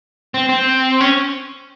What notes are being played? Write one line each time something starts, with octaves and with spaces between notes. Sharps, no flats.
C4
C4
C#4